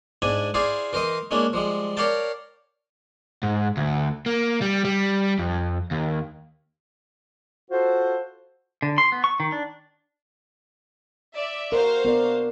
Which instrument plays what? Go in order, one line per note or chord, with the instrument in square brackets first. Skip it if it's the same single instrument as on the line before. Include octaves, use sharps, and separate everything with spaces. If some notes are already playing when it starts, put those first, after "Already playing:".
[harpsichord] G#2 D4 E4 G#5
E4 G#4 C5 D5 F5
E3 A#4 C5 D#5
G#3 A#3 C#4 D4 E4
F3 G3 G#3
A#4 C#5 D5 F5 G5 A5
[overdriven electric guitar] G#2
D2
A#3
G3
G3
F2
D#2
[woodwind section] F4 F#4 A4 C5
[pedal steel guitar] D3
C6
B3
C#6
D#3
D4
[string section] D5 E5
[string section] F#4 C5 F5 [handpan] A#4
[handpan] B3 A#4 D5